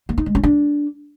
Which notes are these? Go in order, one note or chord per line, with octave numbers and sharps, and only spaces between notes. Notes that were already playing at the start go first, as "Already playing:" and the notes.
A#3
D#4
G#3
C#4
D4